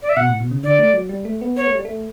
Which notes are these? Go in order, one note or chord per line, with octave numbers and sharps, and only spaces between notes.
D5
E5
B2 F#5
A2
B2
C#3
D3 D5
A3
F#3
G3
A3
B3
B3 C#5
A3
G3
A3